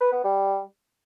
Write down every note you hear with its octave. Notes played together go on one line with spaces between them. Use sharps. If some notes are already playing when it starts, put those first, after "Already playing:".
B4
B3
G3